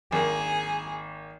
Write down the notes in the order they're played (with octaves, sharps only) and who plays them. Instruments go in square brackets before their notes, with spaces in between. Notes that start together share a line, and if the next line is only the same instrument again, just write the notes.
[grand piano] G#1 A#3 [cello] G#4